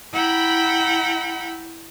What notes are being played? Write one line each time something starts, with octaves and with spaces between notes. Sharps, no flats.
E4 F#5 G5 A#5 B5